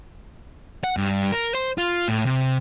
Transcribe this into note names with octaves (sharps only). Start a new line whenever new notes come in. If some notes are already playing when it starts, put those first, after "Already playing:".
F#5
G2
A#4
C5
F4
A2
C3